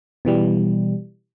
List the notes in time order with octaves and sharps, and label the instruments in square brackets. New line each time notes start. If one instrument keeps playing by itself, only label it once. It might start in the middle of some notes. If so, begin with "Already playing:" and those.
[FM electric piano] B2 E3 G3